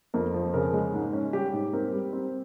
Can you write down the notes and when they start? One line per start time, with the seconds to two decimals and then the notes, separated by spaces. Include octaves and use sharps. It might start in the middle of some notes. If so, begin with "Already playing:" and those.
0.14 F2 A#4
0.34 F3
0.54 C#3 A#4
0.73 G#3
0.93 G#2
1.13 C#4
1.33 G3 G4
1.53 G#2
1.73 C4 A#4
1.93 G3
2.13 C4